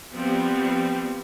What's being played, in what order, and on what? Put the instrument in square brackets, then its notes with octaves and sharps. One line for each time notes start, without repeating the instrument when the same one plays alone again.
[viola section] F3 G3 B3 C4